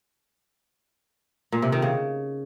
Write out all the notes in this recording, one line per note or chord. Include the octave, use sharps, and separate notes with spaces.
A#2
C3
D#3
C#3